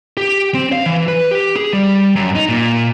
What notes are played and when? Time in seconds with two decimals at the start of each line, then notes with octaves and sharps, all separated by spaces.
0.17 G4
0.54 C4
0.72 F5
0.86 E3
1.08 B4
1.31 G4
1.56 G#4
1.73 G3
2.16 F#2
2.35 D#4
2.49 A#2